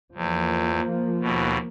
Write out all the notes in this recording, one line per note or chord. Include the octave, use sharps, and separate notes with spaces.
E2 F3 A#3
D#2 B2